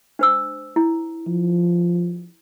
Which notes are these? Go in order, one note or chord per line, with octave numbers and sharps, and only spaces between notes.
D4 C5 E6
E4
F3